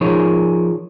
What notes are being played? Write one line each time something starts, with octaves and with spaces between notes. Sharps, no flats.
F3 D#4 G#4 A#4 C#5